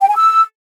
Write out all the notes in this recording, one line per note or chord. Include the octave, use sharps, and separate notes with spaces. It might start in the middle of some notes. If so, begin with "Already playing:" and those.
G5
G#5
E6